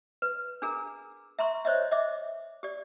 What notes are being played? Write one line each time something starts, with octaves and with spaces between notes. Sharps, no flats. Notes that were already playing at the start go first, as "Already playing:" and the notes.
B4
D4 G#4 A#4 A#5
E5 A#5 C6 C#6
C5 C#5 D#5 E5
D#5 E5 D6
G4 D5